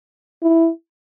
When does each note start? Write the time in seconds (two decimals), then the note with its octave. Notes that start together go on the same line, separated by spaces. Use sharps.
0.43 E4